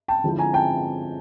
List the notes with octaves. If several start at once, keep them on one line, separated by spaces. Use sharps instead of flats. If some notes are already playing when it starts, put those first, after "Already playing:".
G5 A5
D3 F3 G#3 C4 E4
G#5 A#5
G5 A5